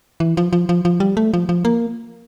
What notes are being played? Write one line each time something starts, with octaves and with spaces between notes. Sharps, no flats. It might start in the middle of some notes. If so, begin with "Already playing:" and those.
E3
F3
F3
F3
F3
G3
A3
F3
F3
A#3